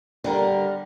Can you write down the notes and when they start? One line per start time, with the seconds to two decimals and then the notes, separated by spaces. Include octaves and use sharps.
0.24 D3 G3 A#4